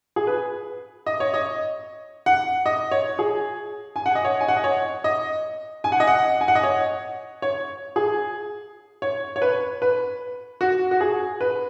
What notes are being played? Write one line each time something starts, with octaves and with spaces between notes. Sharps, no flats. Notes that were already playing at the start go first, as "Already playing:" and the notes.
G#4
B4
D#5
C#5
D#5
F#5
D#5
C#5
G#4
G#5
F#5
D#5
C#5
G#5
F#5
D#5
C#5
D#5
G#5
F#5
D#5
F#5
G#5
F#5
D#5
C#5
C#5
G#4
C#5
C#5
B4
B4
F#4
F#4
G#4
B4